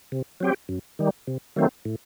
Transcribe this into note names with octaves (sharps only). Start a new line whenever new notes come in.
C3
F#3 C4 G4
F#2
D#3 G3
C3
D#3 F#3 A3 C4
A2